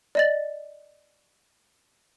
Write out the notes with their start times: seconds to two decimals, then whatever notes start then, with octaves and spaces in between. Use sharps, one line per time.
0.15 D5 D#5 A6